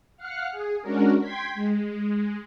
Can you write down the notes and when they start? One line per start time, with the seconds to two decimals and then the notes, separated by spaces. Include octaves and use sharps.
0.17 F5 F#5 F6 F#6
0.51 G#4
0.82 G#3 C#4 D4 F#4 A#4
1.20 G5 C6 G#6 B6
1.54 G#3